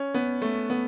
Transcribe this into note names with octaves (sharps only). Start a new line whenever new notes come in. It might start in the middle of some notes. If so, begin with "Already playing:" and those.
Already playing: C#4
B3
A3
B3